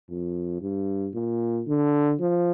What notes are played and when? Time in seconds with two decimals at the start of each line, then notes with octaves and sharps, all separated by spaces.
0.10 F2
0.62 G2
1.15 A#2
1.68 D3
2.21 F3